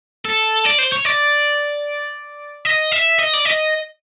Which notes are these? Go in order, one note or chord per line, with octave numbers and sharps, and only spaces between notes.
A4
D5
C5
C#5
D5
D#5
E5
D#5
D5
D#5